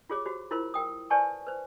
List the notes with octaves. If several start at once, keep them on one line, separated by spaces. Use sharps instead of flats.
F4 G4 G#4 C#5 D6
F#4 G4 C5
E4 F4 A#4 C5 C6
A#4 G5 D#6
B4 C5 D5 G#5 A5 C#6
B4 C5